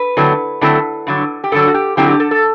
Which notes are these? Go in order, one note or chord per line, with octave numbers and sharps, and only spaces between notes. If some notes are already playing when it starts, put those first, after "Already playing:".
Already playing: B4
D3 F#3 A3 C4 E4
D3 F#3 A3 C4 E4
G2 D3 F#3
G4
G2 D3 F#3 A4
F#4
G4
D3 F#3 C4 E4 G4
G4
A4
A4